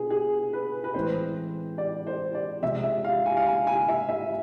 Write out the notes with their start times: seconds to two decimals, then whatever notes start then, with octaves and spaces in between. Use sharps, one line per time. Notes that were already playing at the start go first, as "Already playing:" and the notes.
Already playing: B2 B3 D4 F4 G#4
0.10 G#4
0.53 B4
0.84 B4
0.94 A2 E3 G#3 C4 E4 C5
1.78 D5
2.07 C5
2.35 D5
2.62 C3 F3 G#3 C4 E5
2.83 E5
3.04 F5
3.26 G#5
3.37 F5
3.47 G#5
3.67 G#5
3.88 E5
4.09 E5